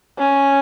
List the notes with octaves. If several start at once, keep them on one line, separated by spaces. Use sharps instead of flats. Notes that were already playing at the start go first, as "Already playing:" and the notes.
C#4